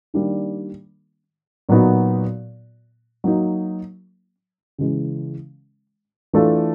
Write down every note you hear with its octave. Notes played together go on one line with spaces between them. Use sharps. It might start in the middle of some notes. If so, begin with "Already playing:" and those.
D#3 G3 A#3 D4
A#2 F#3 B3 D#4 F#4
F#3 A#3 D#4
C#3 E3 G#3
E3 A3 D4 F4 A4